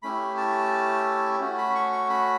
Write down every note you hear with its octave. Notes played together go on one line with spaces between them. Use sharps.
A3 C#4 E4 G4 B5
A5
A3 C#4 F#4
B5
C#6
C#6
B5